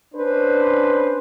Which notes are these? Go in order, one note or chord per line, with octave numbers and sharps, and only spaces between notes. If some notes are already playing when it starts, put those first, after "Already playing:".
C#4 D4 B4 C5